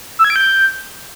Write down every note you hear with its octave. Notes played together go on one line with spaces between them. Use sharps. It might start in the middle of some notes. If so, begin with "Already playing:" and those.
E6
G#6
D7
G6